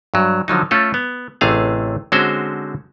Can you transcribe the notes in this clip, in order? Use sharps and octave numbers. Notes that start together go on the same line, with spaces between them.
G2 F#3
D3 F3 F#3 D#4
A3 C#4 F4 A4
B3
A1 C3 A3 G#4 F5
D3 G#3 C4 C#4 F#4 C5